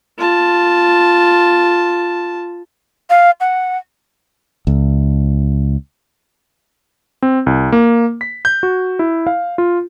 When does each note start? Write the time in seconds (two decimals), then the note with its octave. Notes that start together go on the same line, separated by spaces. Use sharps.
0.19 F4 A5
3.10 F5
3.40 F#5
4.67 C#2
7.22 C4
7.46 C2
7.72 A#3
8.21 B6
8.45 G6
8.63 F#4
8.99 E4
9.27 F5
9.58 F4